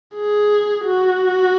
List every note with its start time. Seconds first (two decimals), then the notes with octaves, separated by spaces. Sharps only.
0.15 G#4
0.85 F#4